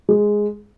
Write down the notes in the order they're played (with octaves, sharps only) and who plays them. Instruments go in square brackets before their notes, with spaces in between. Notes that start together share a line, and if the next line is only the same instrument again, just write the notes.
[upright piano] G#3